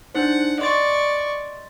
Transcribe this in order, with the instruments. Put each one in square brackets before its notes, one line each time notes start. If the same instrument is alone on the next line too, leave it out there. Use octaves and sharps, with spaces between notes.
[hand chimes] D4 D#4 C5 [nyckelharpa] F#5
[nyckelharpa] D5 C#6 [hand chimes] D#5 C6 A6